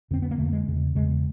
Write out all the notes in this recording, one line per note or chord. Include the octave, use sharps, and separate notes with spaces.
F2 D3 C4
B3
A#3
F2 D3 A3
G#3
E2 C#3
E2 C#3 G#3